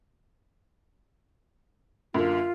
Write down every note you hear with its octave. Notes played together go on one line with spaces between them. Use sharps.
F#2 D3 A#3 F4